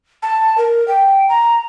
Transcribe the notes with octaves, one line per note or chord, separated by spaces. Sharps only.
A5
A#4
G5
A#5